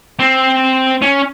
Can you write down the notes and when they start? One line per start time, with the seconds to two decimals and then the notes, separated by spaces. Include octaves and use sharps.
0.19 C4
1.02 C#4